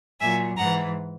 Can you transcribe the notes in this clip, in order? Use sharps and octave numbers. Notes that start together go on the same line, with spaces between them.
A#2 F#3 E5 G#5
G#2 E3 F#5 A#5